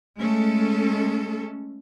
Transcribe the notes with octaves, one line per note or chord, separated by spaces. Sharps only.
G#3 A3 C#4 A4